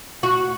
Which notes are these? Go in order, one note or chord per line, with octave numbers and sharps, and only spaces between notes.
F#4